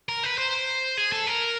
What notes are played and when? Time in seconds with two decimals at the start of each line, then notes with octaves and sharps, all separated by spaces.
0.09 A#4
0.24 B4
0.38 C5
0.97 G#4
1.12 A4
1.27 A#4